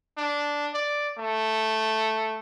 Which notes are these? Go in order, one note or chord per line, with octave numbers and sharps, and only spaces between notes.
D4
D5
A3